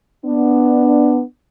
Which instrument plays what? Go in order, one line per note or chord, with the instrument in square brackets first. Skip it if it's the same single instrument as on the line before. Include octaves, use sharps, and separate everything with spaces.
[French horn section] B3 D4